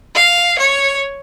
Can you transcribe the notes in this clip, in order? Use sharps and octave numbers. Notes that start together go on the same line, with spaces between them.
F5
C#5